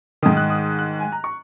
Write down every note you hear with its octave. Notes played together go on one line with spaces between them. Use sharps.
G#2 D#3 D#6
F#6
D#6
F#6
G#5
A#5
C#6